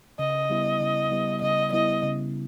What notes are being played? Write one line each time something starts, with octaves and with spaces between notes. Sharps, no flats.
C#3 D#5
G3 B3 E4
C#3
G3 B3 E4
C#3 D#5
G3 B3 E4 D#5
C#3